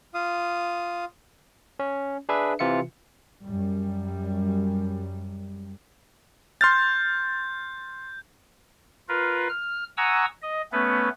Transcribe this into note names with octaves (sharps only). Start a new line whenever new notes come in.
F4 F5 D#6
C#4
D4 G#4 B4 E5
C3 E3 F4 E5 C#7
F#2 G3
C6 F6 G6 A6
F4 A#4 B4
F6
F#5 G#5 A#5 C#6 D#6 E6
D#5
A3 B3 C#4 B4